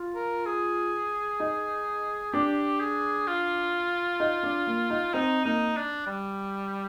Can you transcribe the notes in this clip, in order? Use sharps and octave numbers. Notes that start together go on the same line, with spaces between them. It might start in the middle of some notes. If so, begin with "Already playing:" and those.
Already playing: F4
A#4
G#4
D#4
D4 G4
G#4
F4
D#4
D4
A#3
D#4
C4 D#4
A#3 D#4
D4
G3